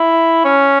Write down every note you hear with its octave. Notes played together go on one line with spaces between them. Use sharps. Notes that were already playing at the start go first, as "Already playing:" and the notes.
Already playing: E4
C#4